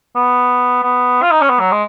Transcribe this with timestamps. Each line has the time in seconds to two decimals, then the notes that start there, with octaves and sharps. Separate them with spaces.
0.16 B3
0.83 B3
1.23 F4
1.31 D#4
1.41 C#4
1.50 B3
1.60 F#3
1.72 G#3